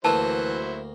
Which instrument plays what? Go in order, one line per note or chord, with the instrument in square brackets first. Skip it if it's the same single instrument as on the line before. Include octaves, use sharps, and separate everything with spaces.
[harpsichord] D2 A#3 [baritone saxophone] E3 [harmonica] F#3 E4 C5 [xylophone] A5